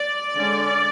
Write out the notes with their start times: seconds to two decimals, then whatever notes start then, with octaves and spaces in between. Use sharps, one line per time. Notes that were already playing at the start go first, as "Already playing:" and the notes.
Already playing: D5
0.36 D3 G#3 C#4